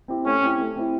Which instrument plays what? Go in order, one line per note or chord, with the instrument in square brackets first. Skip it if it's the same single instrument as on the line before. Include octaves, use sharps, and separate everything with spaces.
[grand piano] C4 E4 G4
[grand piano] A3 [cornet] C#4
[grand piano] C4 E4 G4
A3
C4 E4 G4